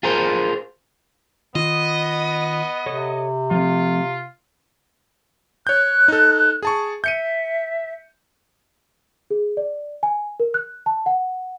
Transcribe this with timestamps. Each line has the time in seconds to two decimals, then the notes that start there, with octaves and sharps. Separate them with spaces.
0.03 F4 G#4 A#4 C5
1.55 D#3 B3 F4 D#5
2.86 C3 A4 C#5
3.51 F3 A3 C4 F4
5.67 C#5 F#6 G6
6.08 D#4 A4
6.62 G#4 A5 C#6
7.04 E5 G6 C#7 D#7
9.31 G#4
9.57 D5
10.03 G#5
10.40 A#4
10.54 F#6
10.86 A5
11.06 F#5